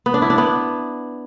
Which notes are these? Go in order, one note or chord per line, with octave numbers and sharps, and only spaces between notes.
B3
D4
E4
D4
B3